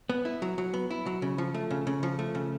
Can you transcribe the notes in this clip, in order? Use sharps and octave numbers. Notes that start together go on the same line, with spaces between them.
B3
E4
F#3
F#3
B3
E4
F#3
C#3
F3
A3
C#3
C#3
F3
A3
C#3